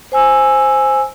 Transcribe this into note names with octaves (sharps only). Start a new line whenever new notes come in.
C5 G#5 E6